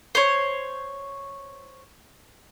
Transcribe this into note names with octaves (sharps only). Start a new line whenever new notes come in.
C5 C#5